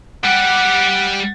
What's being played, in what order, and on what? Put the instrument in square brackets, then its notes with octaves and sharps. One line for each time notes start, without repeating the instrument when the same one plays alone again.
[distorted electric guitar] G3 G4 [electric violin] F#5